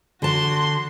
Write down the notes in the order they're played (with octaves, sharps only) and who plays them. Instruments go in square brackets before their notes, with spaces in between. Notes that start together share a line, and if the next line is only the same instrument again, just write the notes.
[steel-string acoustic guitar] D3 A5 [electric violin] F#4 C6